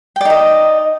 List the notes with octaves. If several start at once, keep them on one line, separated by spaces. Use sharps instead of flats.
D#4 D5 D#5 G5